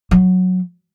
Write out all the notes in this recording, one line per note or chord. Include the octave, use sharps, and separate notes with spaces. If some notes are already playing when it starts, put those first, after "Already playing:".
F#3